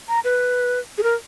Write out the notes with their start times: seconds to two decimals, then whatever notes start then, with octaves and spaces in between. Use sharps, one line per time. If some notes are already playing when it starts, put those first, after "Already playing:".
0.09 A#5
0.24 B4
0.98 G#4
1.03 A#4